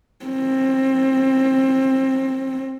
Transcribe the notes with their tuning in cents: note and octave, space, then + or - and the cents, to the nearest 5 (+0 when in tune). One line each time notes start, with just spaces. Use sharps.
C4 +25